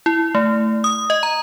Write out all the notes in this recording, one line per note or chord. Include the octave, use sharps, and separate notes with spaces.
E4
A3
D#6
D#5
A#5